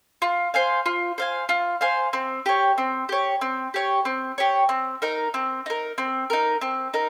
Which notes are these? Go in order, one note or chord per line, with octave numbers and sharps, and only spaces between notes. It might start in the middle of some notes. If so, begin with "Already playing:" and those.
F4
C5 F5 G#5
F4
C5 F5 G#5
F4
C5 F5 G#5
C4
G4 C#5
C4
G4 C#5
C4
G4 C#5
C4
G4 C#5
C4
D#4 A#4
C4
D#4 A#4
C4
D#4 A#4
C4
D#4 A#4